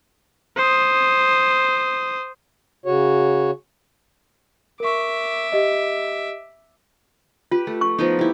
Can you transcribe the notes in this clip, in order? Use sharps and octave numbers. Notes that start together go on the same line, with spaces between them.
C5 D#6
C#3 F#4 C#5
A#4 E5 C#6 D6
G4 D#5
F4 G4 B4
A3
C#6
F3 B3 D#4
E4 G4